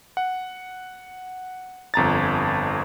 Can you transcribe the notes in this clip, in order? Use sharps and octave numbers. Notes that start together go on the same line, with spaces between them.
F#5
G1 F2 A#5 A6